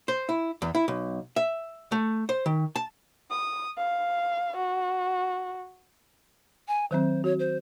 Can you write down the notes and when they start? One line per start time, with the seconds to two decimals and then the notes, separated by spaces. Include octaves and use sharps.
0.08 C5
0.29 E4
0.62 E2
0.75 E4
0.88 B1
1.36 E5
1.92 A3
2.29 C5
2.46 D#3
2.76 A5
3.31 D#6
3.78 F5
4.56 F#4
6.68 G#5
6.91 D#3 F#3 C4 C5
7.24 F#4 C#5
7.39 C5